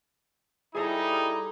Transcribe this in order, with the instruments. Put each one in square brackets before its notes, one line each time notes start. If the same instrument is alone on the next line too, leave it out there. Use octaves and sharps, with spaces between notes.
[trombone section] G3 E4 [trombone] D#4 [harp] G#4 A4 A#5